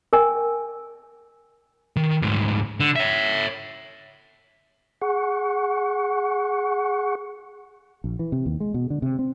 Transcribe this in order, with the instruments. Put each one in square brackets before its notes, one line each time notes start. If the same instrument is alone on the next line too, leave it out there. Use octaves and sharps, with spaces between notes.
[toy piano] A#4 G5 G#5
[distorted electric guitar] D#3
D2 G#2
D3
C#5 E5
[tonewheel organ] G#4 F#5 C#6
[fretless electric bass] A#1
E3
C3
D#2
G#3
B2
D3
C3
C4